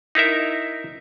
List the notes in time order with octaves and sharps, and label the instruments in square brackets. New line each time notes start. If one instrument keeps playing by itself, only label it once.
[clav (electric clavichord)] D#4 E4 A#4 E5